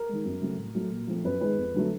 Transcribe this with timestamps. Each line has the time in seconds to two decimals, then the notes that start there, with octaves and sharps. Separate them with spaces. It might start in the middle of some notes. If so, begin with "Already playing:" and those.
Already playing: A#4
0.09 D#3 G#3
0.25 F#2
0.41 C#3 F#3 A3 C4
0.58 A2
0.74 F#3 A3 C4
0.92 A#2
1.08 F3 A3 C4
1.24 F#2 B4
1.41 D#3 G#3 B4
1.57 F2
1.74 D3 F#3 A3